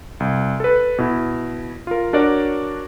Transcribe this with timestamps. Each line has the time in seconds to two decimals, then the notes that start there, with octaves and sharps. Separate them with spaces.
0.20 C2
0.60 A4 B4
0.98 B2 E4
1.87 F4 A#4
2.13 D4 F#4 A#4 C#5 D5